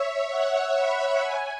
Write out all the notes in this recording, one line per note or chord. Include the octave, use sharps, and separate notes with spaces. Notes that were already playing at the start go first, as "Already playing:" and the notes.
Already playing: C#5 E5
F#5
B5
G#5